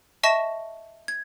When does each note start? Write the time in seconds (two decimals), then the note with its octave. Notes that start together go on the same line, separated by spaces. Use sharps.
0.23 D#5 E5 A5 C#6 A#6 E7
1.08 G#6